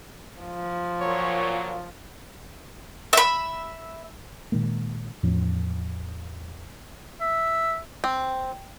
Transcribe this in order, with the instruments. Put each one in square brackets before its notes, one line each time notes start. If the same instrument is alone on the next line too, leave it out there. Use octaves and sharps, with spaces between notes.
[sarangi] F3
[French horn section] A#2 F#3 [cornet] C#5
[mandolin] E5 B5
[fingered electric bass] A#2 D#3 G#3 A#3
E2 A2 F3 C#4
[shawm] E5
[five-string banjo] C4